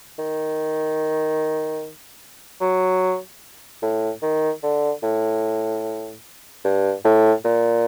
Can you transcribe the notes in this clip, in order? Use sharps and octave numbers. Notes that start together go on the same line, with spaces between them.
D#3
F#3
A2
D#3
D3
A2
G2
A2
A#2